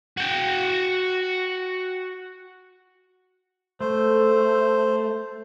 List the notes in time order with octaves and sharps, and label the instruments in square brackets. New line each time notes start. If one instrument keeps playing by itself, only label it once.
[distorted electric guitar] F#4 G5
[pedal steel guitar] A3 [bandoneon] C5